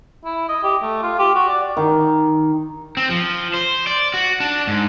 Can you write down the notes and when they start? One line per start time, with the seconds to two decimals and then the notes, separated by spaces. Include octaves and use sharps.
0.24 E4
0.49 D#5
0.63 G4
0.82 A3
1.02 F4
1.19 G4
1.35 F#4
1.48 D5
1.77 D#3
2.97 C4
3.10 F3
3.54 C5
3.87 D5
4.14 F#4
4.40 D4
4.67 G#2